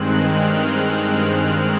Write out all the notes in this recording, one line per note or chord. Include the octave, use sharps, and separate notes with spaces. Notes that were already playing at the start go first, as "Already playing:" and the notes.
Already playing: G2 D#3 G#3 C4 F#6
F6
F#6
F6